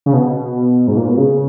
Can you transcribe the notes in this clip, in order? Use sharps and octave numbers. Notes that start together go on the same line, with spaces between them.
C#3
B2
G#2
A#2
B2
C#3